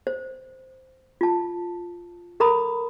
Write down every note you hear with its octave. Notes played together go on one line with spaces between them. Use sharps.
C5
F4 A5
A4 A#4 A#5 B5 D#6